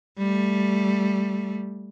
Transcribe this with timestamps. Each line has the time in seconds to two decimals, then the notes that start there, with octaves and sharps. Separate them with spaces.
0.18 G3 A3